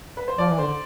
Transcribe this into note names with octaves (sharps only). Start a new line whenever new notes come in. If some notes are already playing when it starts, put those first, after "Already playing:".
B4
C5
F3 D5
E3
D3 C5